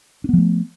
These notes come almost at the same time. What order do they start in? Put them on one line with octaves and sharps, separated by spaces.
D4 B3 F3 A3